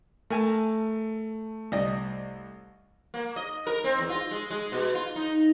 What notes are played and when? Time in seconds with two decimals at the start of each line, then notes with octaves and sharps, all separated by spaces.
0.30 A3 A#4 G#5 A5
1.72 C2 D5 D#5
3.14 A#3
3.36 D#5
3.67 A#4
3.84 C4
3.99 E2
4.10 F4
4.31 G#3
4.51 G#3
4.72 B2
4.95 F4
5.16 D#4